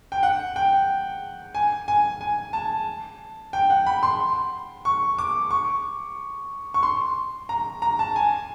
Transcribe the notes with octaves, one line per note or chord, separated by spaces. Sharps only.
G5
F#5
G5
G#5
G#5
G#5
A5
G5
F#5
B5
C6
C#6
D6
C#6
C#6
C6
A#5
A#5
A5
G#5